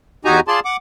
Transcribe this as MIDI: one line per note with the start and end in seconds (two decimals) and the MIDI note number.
0.25 0.40 40
0.25 0.40 63
0.25 0.40 66
0.25 0.40 67
0.25 0.40 80
0.25 0.40 82
0.48 0.60 65
0.48 0.60 68
0.48 0.60 74
0.48 0.60 81
0.48 0.60 84
0.65 0.77 78
0.65 0.77 86